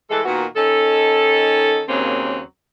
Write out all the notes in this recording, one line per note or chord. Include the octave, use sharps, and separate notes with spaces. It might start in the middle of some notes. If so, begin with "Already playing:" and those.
E3 G#3 A4
A#2 D#3 B3 F#4
D#3 C#4 D#4 A4
D#2 C#3 F#3 A#3 C4 C#4